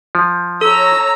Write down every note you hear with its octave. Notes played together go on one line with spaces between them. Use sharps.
F3
A4 C#5 A#5 E6